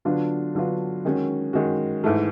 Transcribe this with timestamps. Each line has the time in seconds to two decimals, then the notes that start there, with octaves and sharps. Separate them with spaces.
0.05 D3 F#3 B3 D4 F4
0.55 D3 F#3 B3 D4 F4
1.05 D#3 G#3 C#4 F#4
1.53 D#3 G#3 C#4 F#4
2.04 G#2 E3 A3